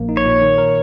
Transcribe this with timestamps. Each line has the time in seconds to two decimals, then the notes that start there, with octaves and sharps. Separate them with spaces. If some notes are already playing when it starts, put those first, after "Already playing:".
Already playing: A#1 A#3
0.09 D#4
0.17 C#5
0.26 A#2
0.42 D#3
0.58 A#4